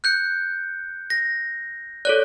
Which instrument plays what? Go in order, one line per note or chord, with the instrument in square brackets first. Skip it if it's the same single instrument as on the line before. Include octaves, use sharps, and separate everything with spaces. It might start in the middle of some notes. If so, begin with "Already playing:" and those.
[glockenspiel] F#6 G6 C#7
A#6
[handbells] A4 C#5 D5 [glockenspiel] F#6